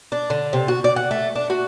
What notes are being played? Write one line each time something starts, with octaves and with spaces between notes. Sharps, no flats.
D4
D3
C3
F#4
D5
F#5
A3
D4
F#4